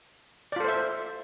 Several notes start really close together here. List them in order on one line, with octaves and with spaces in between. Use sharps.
D5 F4 A4 C5 E5